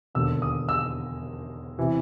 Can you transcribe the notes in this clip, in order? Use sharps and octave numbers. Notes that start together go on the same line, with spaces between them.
E1 D#2 D3 E6
D#6
E6
C3 E3